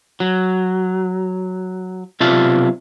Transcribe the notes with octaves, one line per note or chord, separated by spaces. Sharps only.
F#3
B1 C3 F4 D5 E5 A5